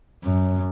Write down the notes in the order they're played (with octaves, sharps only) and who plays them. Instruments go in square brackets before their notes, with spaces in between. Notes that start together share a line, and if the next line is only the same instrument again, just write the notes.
[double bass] F#2